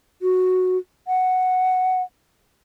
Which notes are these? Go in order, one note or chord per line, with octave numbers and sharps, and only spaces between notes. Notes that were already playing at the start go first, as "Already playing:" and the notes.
F#4
F#5